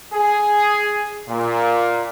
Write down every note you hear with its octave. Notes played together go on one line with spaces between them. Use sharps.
G#4
A#2